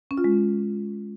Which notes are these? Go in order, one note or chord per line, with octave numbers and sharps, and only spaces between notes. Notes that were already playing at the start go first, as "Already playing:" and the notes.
C#4
F4
G#3